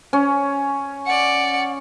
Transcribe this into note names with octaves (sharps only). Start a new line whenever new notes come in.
C#4
D5 F#5 C#7